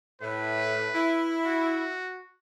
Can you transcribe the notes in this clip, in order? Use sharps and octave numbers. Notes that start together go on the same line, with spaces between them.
A2 B4
E4
F#4